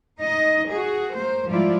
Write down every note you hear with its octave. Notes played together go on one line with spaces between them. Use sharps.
D#4 D#5
F#4 G#4
A#3 C5
G#2 F3 G3 E4 F4 D5